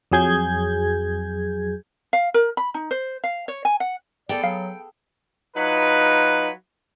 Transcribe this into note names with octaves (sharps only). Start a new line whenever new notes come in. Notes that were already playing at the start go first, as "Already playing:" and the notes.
F2 F#3 G#4 G6 G#6
F5
A#4
B5
D#4
C5
F5
C#5
G#5
F#5
B3 G#4 A4 D5 G5
F#3 F5
F#3 D#4 F4 B4